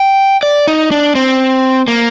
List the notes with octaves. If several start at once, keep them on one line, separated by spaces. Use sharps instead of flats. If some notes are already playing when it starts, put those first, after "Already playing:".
Already playing: G5
D5
D#4
D4
C4
A#3